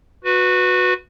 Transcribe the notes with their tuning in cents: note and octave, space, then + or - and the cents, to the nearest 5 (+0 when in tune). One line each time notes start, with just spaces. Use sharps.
F#4 -20 B4 +0